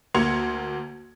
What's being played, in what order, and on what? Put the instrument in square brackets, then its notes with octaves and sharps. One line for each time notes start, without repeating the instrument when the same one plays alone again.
[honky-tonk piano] D2 A#3 C6 G#6 C#7 F7